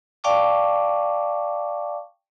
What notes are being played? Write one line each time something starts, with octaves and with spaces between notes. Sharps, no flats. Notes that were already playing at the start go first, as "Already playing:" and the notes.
D5 F5 G5 A5 C#6 D6